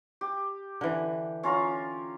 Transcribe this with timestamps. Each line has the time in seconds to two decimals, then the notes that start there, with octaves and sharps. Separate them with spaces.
0.21 G4
0.81 D3 E3
1.43 C#4 F4 A#4